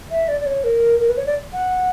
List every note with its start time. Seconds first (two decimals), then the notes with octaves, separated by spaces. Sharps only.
0.11 E5
0.28 D5
0.41 D5
0.46 C#5
0.64 A#4
0.99 A#4
1.09 B4
1.17 C#5
1.26 D5
1.53 F#5